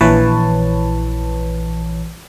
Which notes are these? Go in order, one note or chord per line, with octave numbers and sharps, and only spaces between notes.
A#1 E3 B4 C#5 A5